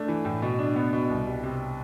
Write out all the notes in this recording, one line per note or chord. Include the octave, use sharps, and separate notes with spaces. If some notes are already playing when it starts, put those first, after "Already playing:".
Already playing: A3 D4
E3
A2
B2
D4
B3
B2
C2
G3
C3